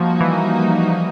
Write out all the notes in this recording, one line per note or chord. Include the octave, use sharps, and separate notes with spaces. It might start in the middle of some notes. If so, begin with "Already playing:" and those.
Already playing: F3 G3 A#3 D#4 F#4
E3